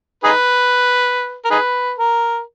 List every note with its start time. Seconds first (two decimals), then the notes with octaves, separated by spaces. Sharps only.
0.24 D#4 G#4 B4
1.45 A#4
1.51 D#4 G#4 B4
1.98 A#4